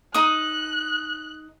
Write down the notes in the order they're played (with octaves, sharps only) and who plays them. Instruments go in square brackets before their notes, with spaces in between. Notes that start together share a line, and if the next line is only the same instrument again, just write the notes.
[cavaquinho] D#4 D#6 [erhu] F#6